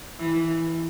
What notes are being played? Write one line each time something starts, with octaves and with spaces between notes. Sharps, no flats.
E3